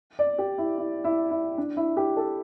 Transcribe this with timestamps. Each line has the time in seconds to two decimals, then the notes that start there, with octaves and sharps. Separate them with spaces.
0.19 D5
0.38 G4
0.58 E4
0.78 E4
1.04 E4
1.31 E4
1.58 D4
1.77 E4
1.97 G4
2.17 A4